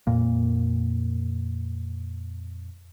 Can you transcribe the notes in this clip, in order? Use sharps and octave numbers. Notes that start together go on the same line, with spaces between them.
F2 A#2 A#3